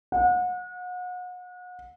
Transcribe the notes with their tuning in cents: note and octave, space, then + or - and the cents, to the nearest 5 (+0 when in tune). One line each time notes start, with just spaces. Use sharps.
F#5 -35